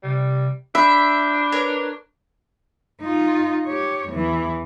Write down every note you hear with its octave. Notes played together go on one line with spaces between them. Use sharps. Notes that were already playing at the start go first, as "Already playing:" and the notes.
C3 G3
D4 E5 B5 G6
A#4 B4 C#5
D#4 F4
G4 C#5
E2 E3